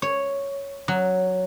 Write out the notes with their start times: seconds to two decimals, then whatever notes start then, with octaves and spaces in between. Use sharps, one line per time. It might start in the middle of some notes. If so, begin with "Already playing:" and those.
0.02 C#5
0.88 F#3